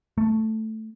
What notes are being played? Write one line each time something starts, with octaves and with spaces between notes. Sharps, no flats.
A3